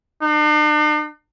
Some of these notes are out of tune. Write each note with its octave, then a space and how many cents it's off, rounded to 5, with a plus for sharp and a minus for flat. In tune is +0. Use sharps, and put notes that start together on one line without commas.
D4 +45